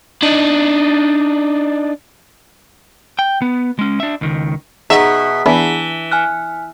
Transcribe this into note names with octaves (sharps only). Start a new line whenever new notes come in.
D4 D#4
G5
B3
G#3 C#4
D4 E5
C#2 D#3
B2 D#4 G#4 E5 F#5 A#5
E3 B3 D4 E4
G#5 F6 F#6